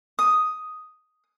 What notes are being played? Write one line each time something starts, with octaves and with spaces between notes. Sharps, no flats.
D#6